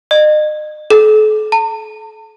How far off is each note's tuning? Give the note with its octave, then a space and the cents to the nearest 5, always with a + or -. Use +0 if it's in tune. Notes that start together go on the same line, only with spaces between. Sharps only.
D#5 -40
A4 -40
A5 +45